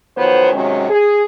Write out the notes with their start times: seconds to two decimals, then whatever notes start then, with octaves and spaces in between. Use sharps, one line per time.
0.17 D#3 F3 F#3 B3 C5 C#5
0.53 C3 D#3 F#3 G#3 C#4
0.90 G#4